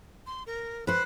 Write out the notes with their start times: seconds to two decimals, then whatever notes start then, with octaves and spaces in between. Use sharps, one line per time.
0.27 C6
0.47 A#4
0.87 B4 C5 F#6